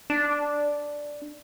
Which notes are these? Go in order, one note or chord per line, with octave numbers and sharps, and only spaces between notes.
D4